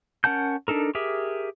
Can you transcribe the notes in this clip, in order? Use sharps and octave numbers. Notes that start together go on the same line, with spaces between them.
C#4 A#4 F#5 A5 G6
D4 D#4 A4 A#4
G4 G#4 A#4 E5